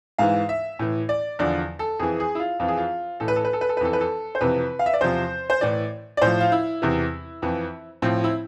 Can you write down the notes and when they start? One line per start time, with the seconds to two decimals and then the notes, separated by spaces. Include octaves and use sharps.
0.18 G#2 E3 F5
0.49 E5
0.79 A2 E3
1.09 D5
1.39 E2 D3 F3 D5
1.79 A4
1.99 F2 E3 G#4
2.20 G#4
2.35 E4
2.39 F4
2.60 F2 E3 F4
2.68 G#4
2.77 F4
3.20 A2 E3 A4
3.28 B4
3.36 A4
3.45 B4
3.53 A4
3.61 B4
3.69 A4
3.77 B4
3.81 F2 E3 A4
3.93 B4
4.01 A4
4.35 C5
4.41 F2 C3 E3 B4
4.79 F5
4.86 E5
4.94 D5
5.01 E2 C3 F3 C5
5.50 C5
5.61 A2 E3 D5
6.17 D5
6.21 A2 F3 C5
6.41 F4
6.52 E4
6.82 E2 C3 E3
7.42 F2 E3
8.02 A2 F3 C4
8.24 E4